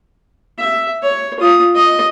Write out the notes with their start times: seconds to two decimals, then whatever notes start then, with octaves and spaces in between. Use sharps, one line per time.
0.58 E5
1.03 C#5
1.40 F4 D#6
1.75 D#5